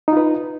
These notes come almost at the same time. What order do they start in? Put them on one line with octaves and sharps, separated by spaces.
D#4 F4 B4